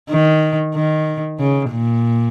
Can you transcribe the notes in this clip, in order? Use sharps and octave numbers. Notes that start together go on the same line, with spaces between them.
D#3
D#3
C#3
A#2